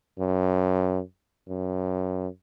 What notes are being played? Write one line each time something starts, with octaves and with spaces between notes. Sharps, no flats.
F#2
F#2